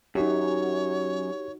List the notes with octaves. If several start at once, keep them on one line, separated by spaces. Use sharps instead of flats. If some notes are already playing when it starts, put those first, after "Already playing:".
F#2 D#4 F#4 G4 C#5